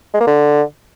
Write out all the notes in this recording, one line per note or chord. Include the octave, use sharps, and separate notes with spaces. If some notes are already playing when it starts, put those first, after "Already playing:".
G#3
A#3
D3